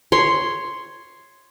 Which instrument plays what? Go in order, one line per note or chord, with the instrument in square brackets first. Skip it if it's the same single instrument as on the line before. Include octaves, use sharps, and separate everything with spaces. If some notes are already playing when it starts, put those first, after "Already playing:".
[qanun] C#5 C6